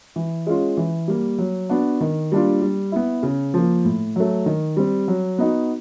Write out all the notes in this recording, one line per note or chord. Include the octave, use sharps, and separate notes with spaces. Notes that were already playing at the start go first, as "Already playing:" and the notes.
E3
G#3 C#4 F4
E3
G3 A#3
F#3
B3 D4 F#4
D#3
G3 A#3 D4 F4
G3
B3 E4
C#3
F3 A#3
A2
F#3 A3
D#3
G3 C4
F#3
B3 D#4 F#4